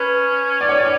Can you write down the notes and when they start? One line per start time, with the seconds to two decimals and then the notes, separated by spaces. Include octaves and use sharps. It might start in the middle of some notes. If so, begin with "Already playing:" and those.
Already playing: C#4 B4
0.61 D5
0.69 C#5
0.77 D5